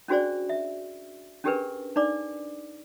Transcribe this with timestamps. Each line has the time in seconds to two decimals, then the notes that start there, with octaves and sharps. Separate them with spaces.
0.08 C#4 D4 F#4 G#4 C5 D5
0.49 E5
1.44 C#4 D4 G4 G#4 A#4 B4
1.96 D4 D#4 D5 D6